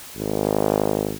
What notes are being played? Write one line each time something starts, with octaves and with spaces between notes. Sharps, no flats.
G#1